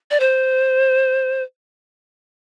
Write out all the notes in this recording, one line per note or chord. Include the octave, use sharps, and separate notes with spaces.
D5
C5